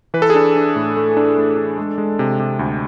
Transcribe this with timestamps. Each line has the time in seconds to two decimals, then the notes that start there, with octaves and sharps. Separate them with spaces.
0.14 E3 B4
0.22 A4
0.30 G#4
0.35 D4 A4
0.56 D4
0.76 A2
0.97 A3
1.17 D4
1.37 A3
1.57 D4
1.78 G#3
1.98 G#3
2.19 C3
2.40 C3
2.59 D2